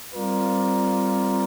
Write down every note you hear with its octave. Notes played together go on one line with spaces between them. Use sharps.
G3 C4 F4 A#4 D5